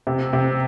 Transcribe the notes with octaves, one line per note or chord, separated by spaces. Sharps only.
C3
C3